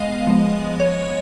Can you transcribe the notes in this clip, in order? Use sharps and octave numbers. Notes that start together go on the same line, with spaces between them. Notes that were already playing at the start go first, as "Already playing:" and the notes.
Already playing: G#3 B3 D#5 F5
F3 G#3 B3
C#5